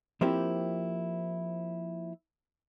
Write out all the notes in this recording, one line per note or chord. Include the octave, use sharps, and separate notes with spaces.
F3 A#3 C4 E4 G4